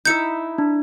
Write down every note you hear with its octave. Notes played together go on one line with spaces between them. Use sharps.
D#4 E4 E5 G6 C#7
D4